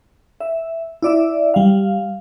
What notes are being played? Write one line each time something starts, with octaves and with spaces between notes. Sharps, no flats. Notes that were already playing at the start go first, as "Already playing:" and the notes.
E5
E4 D5 E5
G3 F5